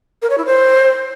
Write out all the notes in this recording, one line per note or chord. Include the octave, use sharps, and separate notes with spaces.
A#4
C#5
E4
C5